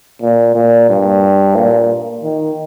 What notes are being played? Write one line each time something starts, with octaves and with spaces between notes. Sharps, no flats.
A#2
A#2
G2
A#2
D#3